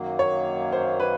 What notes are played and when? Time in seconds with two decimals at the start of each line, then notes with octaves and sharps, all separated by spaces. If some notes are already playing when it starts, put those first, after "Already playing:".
Already playing: F#2 D#3 F#3 A#3
0.19 C#5
0.72 C5
1.00 B4